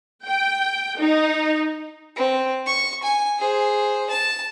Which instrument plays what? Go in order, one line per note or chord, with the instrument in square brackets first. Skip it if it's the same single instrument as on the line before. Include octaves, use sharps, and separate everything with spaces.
[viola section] G5
D#4
[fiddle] C4
C#6
G#5
G#4 C5
A5